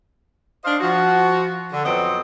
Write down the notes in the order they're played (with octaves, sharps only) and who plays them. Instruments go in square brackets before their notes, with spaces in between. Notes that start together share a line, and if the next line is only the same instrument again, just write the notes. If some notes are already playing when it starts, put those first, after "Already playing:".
[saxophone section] D4 C5 D#5 F5
F3 F#4
D3
F2 F#3 B3 C4 D#5